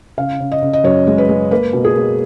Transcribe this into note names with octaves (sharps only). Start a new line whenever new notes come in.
C#3 F5
C#3
D#5
C#3
D#5
F#2 C#5
G#3
B4
G#3
A#3 B4
B2
G#4
A#3